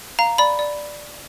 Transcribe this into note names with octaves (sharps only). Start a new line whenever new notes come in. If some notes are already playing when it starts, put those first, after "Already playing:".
F5 A#5
D5 B5
D5